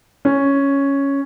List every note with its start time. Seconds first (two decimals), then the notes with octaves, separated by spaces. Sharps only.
0.25 C#4